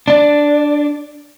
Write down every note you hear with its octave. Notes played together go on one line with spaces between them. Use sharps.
D4 D5